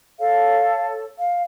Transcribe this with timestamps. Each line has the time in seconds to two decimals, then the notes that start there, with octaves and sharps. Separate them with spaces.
0.20 A4 C#5 F5
1.19 F5